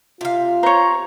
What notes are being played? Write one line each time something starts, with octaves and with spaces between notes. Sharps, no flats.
C3 F4 F5
C5 C#5 A#5